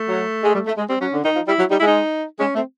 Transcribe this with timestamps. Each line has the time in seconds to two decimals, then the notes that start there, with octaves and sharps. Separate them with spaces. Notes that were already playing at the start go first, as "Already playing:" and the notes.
Already playing: A3
0.08 F#3
0.43 G#3
0.55 G3
0.66 A3
0.78 G#3
0.89 G3 C4
1.00 F#3 C#4
1.13 D3
1.24 D#3 D#4
1.35 F3
1.47 G3 E4
1.59 F#3
1.70 G3 D#4
1.79 G#3 E4
1.87 D#4
2.40 G#3 C#4
2.55 A3 C4